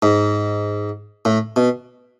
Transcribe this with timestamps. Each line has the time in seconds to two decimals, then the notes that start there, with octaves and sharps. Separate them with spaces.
0.02 G#2
1.25 A2
1.56 B2